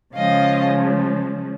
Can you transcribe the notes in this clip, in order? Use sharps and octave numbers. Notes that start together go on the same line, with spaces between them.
C#3 F3 G#3 D#5 F5